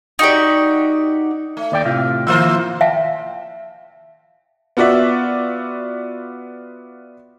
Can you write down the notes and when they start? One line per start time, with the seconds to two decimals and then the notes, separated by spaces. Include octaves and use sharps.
0.19 D#4 F#4 G4 D5
1.57 A3
1.72 D#2 D5 G5
1.85 A2 C3 F4
2.27 D#3 F3 A#3 E4 F4 C5
2.81 E5 F5 G5 A5
4.77 B3 F4 F#4 D5 E5